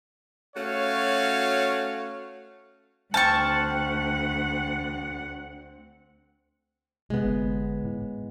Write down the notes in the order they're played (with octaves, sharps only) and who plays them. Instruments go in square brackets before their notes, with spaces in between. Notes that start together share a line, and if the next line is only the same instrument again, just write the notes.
[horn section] A3 C#4 F#4 C#5 F5
[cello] D2 F#5 [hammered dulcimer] C4 [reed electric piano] G5 F6 G6 [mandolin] A5 C#6
[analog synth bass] C3 [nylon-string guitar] G#3 B3
[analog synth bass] G1
A2